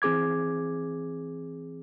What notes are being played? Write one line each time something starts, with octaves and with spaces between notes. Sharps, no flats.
E3 C4 G#4 D6 G#6